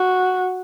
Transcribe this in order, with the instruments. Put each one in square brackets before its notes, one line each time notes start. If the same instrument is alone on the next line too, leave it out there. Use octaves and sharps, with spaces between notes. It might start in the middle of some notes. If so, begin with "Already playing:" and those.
Already playing: [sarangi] F#4